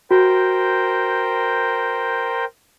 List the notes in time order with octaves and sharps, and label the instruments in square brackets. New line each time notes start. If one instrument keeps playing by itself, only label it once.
[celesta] F#4 [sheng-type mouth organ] A#4 C5 G5